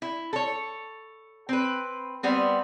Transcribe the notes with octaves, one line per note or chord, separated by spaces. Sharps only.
E4
A4 C#5
C4 B4
G3 B3 C4